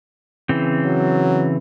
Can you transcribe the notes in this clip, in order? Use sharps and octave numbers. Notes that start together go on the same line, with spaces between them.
C#3 E3 C4
F#3